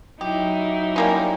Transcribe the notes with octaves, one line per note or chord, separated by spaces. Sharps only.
F#3 D#4 E4 G4
G3 A#3 C#4